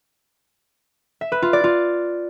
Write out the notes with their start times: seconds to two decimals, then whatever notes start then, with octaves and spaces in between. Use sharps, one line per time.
1.21 E5
1.32 B4
1.42 F4
1.53 D5
1.64 F4